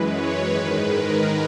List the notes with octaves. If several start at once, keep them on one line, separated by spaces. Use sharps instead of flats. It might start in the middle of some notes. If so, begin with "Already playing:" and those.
Already playing: F#2 E3 G#3 B4
C#5
G#2 D#3 G#3 B4
A#4